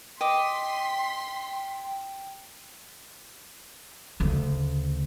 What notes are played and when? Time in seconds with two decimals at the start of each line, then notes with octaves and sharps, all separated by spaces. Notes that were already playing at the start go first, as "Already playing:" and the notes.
0.21 D#5 G5 C6 D6 B6
4.20 D2 C#3